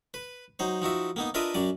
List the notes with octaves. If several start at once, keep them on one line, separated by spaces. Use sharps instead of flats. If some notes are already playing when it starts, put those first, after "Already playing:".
B4
F#3 D#4 C5
F3 D#4 F#4 E5
A#3 B3 D#4
D4 F4 A#4 B4 D#5 E5
F#2 F#3 D5